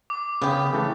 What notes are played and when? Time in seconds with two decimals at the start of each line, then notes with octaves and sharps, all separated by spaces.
0.10 D6
0.42 C#3 B3 G4
0.73 E3 A3